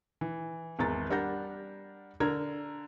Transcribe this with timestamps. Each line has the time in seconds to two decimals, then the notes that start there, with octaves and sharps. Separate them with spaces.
0.21 E3
0.79 G#1 E2 A#5 A6
1.10 G3 D4 A#4 F#5 G6 A#6
2.20 D3 A#4 A#5 G#6